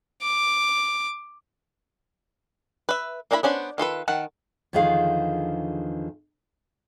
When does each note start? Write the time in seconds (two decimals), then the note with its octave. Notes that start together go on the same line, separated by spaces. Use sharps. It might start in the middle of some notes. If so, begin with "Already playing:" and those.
0.22 D6
2.89 B4 E5
3.31 A#3 D4 E4 A#5 B5
3.43 B3 C#4 D4 C5
3.78 D#3 F4 A4 B4
4.08 D#3 F#5 A5
4.73 E2 D3 D#3 F3 G#4 F5